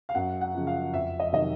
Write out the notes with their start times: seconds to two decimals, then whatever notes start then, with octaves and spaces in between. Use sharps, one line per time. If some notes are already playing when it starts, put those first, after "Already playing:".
0.09 F5
0.15 F#2 F#5
0.41 F#5
0.55 C#3 F3
0.67 F5
0.93 F2 E5
1.20 D#5
1.32 C3 D#3 F#3 D#5